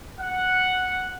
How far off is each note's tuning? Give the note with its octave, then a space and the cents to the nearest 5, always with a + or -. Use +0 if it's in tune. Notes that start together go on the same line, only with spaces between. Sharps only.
F#5 -5